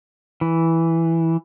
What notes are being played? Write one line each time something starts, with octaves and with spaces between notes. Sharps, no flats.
E3